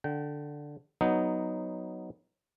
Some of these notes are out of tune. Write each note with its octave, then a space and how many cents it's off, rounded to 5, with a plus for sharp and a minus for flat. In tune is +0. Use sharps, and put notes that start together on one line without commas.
D3 +0 G5 -30
F#3 +0 B3 +0 D#4 +0